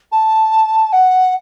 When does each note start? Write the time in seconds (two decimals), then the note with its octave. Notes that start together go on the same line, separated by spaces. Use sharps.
0.11 A5
0.92 F#5